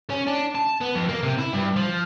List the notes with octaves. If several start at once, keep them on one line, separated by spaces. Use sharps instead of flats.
C#4
D4
A5
B3
F2
A#3
C3
E4
G2
F3